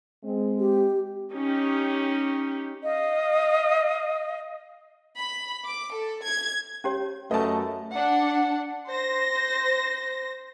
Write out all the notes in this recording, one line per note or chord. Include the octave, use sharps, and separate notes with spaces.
G#3 C4
G4
C#4 D#4 G4
D#5 F5
B5
D6
A4
G#6
C#4 G4 C#5
F#2 A3 B4 D#5 A5
D4 F#5
C5 A#6